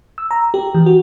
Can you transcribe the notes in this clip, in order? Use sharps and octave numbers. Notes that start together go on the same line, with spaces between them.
E6
A#5
G4
E3
F#4